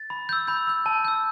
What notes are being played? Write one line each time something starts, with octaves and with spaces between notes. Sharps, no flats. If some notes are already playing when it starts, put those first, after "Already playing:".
Already playing: A6
B5
E6 G6
B5 G6
E6 G6
A5
E6 G6